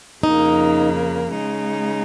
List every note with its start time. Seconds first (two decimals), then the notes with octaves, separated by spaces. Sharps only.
0.23 F2 C#3 A#3 D#4
1.32 C#3 G#3 D#4